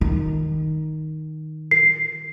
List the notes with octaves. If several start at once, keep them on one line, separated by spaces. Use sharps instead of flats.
D#3
C7